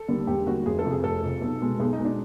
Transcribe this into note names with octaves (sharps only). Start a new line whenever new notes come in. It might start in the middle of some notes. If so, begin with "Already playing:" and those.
Already playing: A4
D#2 D3 G3
E1 G4
D#2 D3 G3 F#4
F1 G#4
A4
F2 C3
G#4
F1 A4
F2 C3
B1
B2 G#3
B1 G#4
D#4
B2 G#3
D4